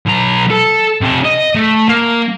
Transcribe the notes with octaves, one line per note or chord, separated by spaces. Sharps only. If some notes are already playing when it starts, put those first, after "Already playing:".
B1 A#5
A4
C3 A4
D#5
A3
A#3